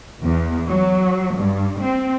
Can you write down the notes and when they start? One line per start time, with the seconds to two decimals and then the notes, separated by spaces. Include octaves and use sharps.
0.23 E2
0.68 F#3
1.37 G2
1.80 C4